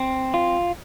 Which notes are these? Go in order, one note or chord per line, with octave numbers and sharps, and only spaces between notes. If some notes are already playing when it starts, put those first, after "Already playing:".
Already playing: C4
F4